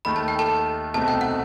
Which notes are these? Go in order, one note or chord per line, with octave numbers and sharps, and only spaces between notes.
D#2 D#3 A3 B5
A5
G5
A4 A5
C2 B2 A3 C4 D#4 A5
G5
F#5